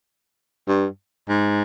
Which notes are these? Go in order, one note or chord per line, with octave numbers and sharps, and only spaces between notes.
G2
G#2